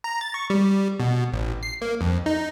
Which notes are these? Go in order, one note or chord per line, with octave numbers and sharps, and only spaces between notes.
A#5
A6
C#6
G3
B2
A1
C7
A#3
F2
D#4